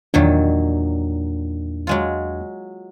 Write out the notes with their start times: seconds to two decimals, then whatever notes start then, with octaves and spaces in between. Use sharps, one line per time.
0.14 E2 A#2 D#3 F#3 D4
1.87 F#3 G#3 F4